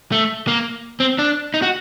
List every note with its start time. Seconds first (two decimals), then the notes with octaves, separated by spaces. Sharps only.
0.12 A3
0.48 A#3
1.00 C4
1.19 D4
1.54 D#4
1.62 F#4